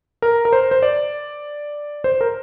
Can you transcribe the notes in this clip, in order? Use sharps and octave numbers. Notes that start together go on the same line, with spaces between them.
A#4
A#4
C5
C5
D5
C5
A#4